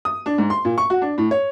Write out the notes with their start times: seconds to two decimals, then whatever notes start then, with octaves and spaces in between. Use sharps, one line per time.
0.05 D#6
0.26 D4
0.38 G#2
0.50 C6
0.65 A#2
0.78 C#6
0.90 F#4
1.02 D4
1.18 A2
1.31 C#5